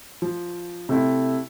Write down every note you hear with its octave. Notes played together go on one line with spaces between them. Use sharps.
F3
C3 A3 E4